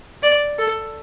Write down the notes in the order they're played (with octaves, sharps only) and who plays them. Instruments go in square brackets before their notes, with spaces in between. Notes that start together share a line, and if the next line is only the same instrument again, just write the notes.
[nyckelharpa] D5
A4